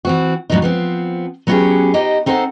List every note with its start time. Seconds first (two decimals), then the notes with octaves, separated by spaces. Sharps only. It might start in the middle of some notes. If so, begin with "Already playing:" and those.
0.05 E3 C4 F#4
0.50 F2 A2 F#3 C4 D4 D#4
0.62 F3 B3 C4
1.47 F#3 B3 C#4 F4 G4 G#4
1.94 D#4 G4 C5 D#5
2.26 C4 D#4 A4 C5 F#5